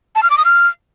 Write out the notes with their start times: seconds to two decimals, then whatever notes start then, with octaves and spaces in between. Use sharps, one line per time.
0.16 A5
0.23 F6
0.30 D6
0.38 D#6
0.45 F6